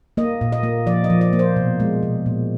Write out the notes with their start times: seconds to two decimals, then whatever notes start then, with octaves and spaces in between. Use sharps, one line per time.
0.17 A#3 D#5
0.41 A#2
0.52 D#5
0.63 A#3
0.86 F3 D5
1.04 D#5
1.10 F3
1.21 D5
1.33 A#3
1.39 C5
1.56 B2
1.80 G#3
2.03 B2
2.26 A#2